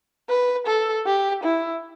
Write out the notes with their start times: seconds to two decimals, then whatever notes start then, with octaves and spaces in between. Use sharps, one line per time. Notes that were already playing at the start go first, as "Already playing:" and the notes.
0.29 B4
0.67 A4
1.06 G4
1.43 E4